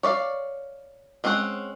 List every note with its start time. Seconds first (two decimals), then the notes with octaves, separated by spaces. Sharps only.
0.03 C#5 D5 E5 F5
1.24 G#3 C4 C#4 G#4 F#5